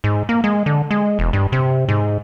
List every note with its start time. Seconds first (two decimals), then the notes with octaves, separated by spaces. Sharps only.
0.04 G#2
0.29 A#3
0.44 G#3
0.66 D3
0.91 G#3
1.19 E1
1.33 G2
1.52 C3
1.89 G#2